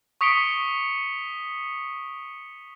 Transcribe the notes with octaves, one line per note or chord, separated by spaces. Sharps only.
C#6 D#6 B6 C#7 D7 G7